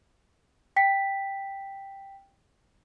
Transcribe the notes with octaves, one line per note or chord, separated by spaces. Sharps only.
G5 B6